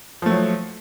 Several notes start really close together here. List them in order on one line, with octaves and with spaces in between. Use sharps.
F3 A3 F#3